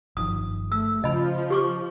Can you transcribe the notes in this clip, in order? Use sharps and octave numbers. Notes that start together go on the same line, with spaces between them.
G1 D#3 F3 D#6
A3 E6
C#3 F3 D#5 B5
G4 C#6 D6